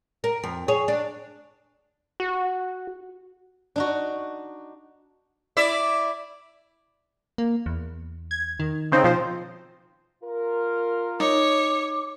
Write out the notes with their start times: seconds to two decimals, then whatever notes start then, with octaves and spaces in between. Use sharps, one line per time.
0.24 A#4
0.44 F2
0.68 G#4 C#5
0.88 D4
2.20 F#4
3.76 D4 D#4 F#4
5.57 E4 D5 E5
7.38 A#3
7.66 E2
8.31 G#6
8.60 D#3
8.92 C#3 C4 D#4
9.04 B2 F3 C5
10.24 F4 A#4
11.20 D#4 C#5 D6